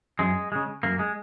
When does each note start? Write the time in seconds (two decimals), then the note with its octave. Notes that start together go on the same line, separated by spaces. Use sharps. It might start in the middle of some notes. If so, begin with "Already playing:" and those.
0.19 F#2 G#3
0.52 C#3 G#3
0.83 F#2 A#3
0.99 G#3